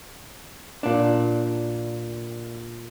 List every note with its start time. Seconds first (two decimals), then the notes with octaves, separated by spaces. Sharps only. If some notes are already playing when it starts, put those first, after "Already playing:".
0.83 A#2 D4